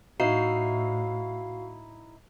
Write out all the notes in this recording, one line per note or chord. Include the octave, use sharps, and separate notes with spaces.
A2 D#4 E4 F#4 F5 C7